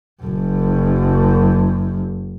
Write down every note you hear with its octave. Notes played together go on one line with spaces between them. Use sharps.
F#1 F#2